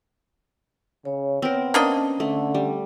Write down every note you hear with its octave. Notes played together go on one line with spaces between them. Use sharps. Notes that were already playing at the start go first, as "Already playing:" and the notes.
C#3 C#5
B3 C4 A#4
A#3 C#4 D4 D#5 A5
D3 A3
G3